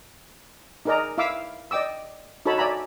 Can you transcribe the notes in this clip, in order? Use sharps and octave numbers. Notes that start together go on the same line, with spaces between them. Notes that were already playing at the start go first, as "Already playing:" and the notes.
D#4 G#4 A#4 D5 D#5 A#5
E4 E5 F5 D6 E6
D5 D#5 G5 D6 E6
D#4 F#4 A4 C#5 A5 B5
D5 E5 G#5 A#5 B5